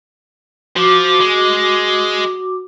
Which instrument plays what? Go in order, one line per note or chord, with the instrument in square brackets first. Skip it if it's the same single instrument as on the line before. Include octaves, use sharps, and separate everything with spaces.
[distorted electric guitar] F3 [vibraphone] F#4 D6
[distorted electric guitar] G#3